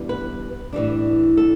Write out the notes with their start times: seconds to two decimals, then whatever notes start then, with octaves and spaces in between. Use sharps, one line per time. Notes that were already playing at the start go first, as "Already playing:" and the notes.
Already playing: E2 B2 G3 B3 D4
0.09 B4
0.73 A2 E3 G3 D4
1.37 A4